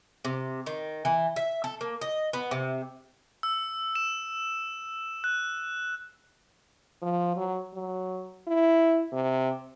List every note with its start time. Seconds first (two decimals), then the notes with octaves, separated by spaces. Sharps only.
0.25 C3
0.66 D#3
1.05 E3
1.36 E5
1.64 A4
1.81 A#3
2.01 D#5
2.33 B3
2.51 C3
3.43 E6
3.95 E7
5.24 F#6
7.02 F3
7.36 F#3
7.74 F#3
8.47 E4
9.12 C3